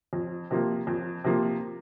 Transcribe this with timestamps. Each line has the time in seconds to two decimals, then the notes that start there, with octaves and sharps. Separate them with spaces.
0.13 F2
0.51 C3 F3 A#3
0.87 F2
1.24 C3 F3 A#3